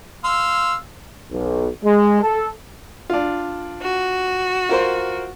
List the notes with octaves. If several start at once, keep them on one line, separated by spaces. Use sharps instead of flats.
F5 C6 E6
B1
G#3
A4
D4 F4
F#4
F4 A#4 C5